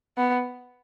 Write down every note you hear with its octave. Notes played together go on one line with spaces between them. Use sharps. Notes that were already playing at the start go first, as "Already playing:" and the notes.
B3